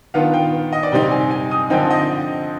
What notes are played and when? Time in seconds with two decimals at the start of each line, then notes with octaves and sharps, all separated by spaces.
0.14 D#3 B3 D4 F4 F5
0.34 G5
0.73 D#5
0.83 D5
0.92 C3 G3 C4 D#4 G5
1.11 G#5
1.31 G#5
1.51 D#6
1.70 D3 F3 C4 D#4 G5
1.91 D#5